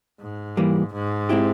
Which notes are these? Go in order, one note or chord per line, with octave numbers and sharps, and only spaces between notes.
G#2
E3 G3 A#3
G#2
G#3 C4 E4 G4